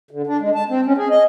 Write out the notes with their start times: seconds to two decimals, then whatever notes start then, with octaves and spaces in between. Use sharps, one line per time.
0.11 D3
0.27 D4
0.40 G#3
0.55 A5
0.69 C4
0.86 C#4
0.98 G#4
1.10 D#5